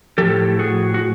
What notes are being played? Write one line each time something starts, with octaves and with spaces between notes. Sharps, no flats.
A2 F3 G4 A4
F#4 G#4
F#4